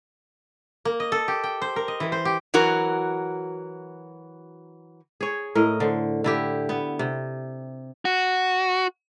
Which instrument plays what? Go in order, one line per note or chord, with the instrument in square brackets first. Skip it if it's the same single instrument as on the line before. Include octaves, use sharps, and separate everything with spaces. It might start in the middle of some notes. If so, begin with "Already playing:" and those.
[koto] A#3
D#5
A4
G4
G5
C5
A#4
D#5
E3
C5
G4
[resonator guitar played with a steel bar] E3 F#3 F#4 A#4
[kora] G#4 C#5
A2 A#4 D#5
D3 C5
D3 E4 G4
B3
C3
[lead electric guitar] F#4